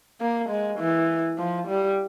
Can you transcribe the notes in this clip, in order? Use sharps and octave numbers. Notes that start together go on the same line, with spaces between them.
A#3
G#3
E3
F3
G3